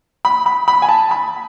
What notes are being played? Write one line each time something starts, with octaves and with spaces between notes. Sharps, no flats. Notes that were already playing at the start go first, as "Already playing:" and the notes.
B5
B5
B5
G#5
A5
B5